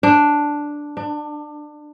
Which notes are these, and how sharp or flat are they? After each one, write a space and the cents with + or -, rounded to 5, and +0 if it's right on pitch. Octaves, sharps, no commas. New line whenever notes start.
D4 +0
D4 +25